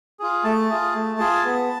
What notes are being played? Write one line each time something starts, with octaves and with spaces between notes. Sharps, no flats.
F4 G#4
A3 A5
F4 G#4
A3
F4 G#4
B3